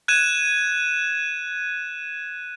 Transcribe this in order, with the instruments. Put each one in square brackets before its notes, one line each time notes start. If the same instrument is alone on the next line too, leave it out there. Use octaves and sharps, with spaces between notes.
[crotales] F#6 G#6 D#7 E7